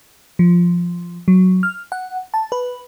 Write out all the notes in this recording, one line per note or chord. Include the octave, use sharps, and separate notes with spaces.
F3
F#3
F6
F#5
A5
B4